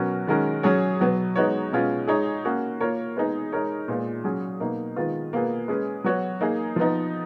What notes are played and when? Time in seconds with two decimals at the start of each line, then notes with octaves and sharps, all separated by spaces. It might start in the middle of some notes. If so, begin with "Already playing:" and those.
Already playing: B2 F#3 C#4 F#4 A#4
0.27 D#3 G#3 C#4 F#4 A#4
0.63 F#3 C#4 G#4 C#5
1.00 B2 F#3 B3
1.36 G#3 B3 D#4 F#4 C#5
1.72 B2 G#3 C#4 F4
2.07 G#3 D#4 G#4 C#5
2.45 A#3 C#4 F#4
2.80 A#3 F4 A#4 C#5
3.17 G#3 B3 D#4 G#4
3.52 G#3 D#4 A#4 C#5
3.88 A#2 G#3 B3 F4
4.24 F#3 C#4 G#4
4.60 B2 A#3 D#4
4.96 D#3 G#3 B3 F4
5.33 B2 A#3 F4 G#4 B4
5.68 G#3 C#4 G#4 B4
6.04 F#3 B3 F#4 C#5
6.41 A#3 D#4 G#4
6.76 F3 B3 D#4